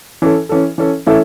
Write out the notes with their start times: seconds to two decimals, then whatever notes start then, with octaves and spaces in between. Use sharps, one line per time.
0.22 E3 C#4 A4
0.49 E3 C#4 A4
0.78 E3 C#4 A4
1.07 E3 A3 C#4 E4 A4